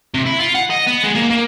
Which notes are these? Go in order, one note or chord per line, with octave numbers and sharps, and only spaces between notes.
C3
E4
F4
F#5
D#5
B3
G#3
A#3
A#3